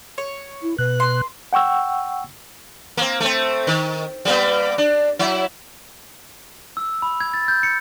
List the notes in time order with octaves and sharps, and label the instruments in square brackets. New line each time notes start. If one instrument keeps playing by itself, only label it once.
[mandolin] C#5
[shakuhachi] E4
[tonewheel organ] B2 F#6 [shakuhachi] B4
[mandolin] C6
[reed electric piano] F#5 G5 C#6 E6
[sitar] A#3 C4
A3 C4
D#3
G3 A#3 B3
D4
F#3 E4
[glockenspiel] E6
B5
G#6
A6
G6
C#7